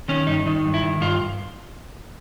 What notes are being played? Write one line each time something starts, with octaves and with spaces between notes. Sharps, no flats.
D#3 C#4
G2 D#4
D#3 D#4
G2
E4
D#3
G2 F4